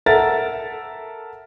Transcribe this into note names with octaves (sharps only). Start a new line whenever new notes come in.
A4 A#4 E5 F#5 A6